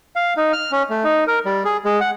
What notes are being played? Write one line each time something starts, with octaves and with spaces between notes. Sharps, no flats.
F5
D#4
F6
C#4
A3
D#4
A#4
G3
G#4
G#3
F#5